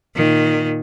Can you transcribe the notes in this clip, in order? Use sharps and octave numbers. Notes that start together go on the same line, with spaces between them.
A#2 D#3